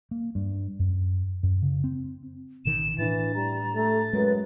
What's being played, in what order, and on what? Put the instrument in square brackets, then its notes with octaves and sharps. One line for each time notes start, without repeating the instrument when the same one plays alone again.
[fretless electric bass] A#3
G2
F#2
F#2
C#3
C4
[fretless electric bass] A1 B2 D#3 [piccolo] E7
[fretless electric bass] A2 D4 [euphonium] E3 [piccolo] A6
[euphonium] G3 [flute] A#5
[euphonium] A3 [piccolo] A6
[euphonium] F#2 [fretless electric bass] G#3 [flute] B4